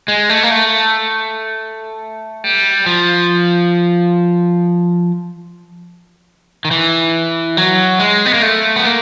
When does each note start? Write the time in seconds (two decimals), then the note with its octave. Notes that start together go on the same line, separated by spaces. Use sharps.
0.08 G#3
0.29 A3
0.43 A#3
0.51 A3
2.44 G3
2.86 F3
6.65 D#3
6.71 E3
7.57 F#3
7.99 G#3
8.26 B3
8.34 A#3
8.42 A3
8.76 B3
8.85 A#3